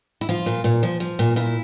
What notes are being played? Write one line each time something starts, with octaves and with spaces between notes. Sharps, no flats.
E4
F3 F4
A#2
A#2
F3
F3
A#2
A#2 E4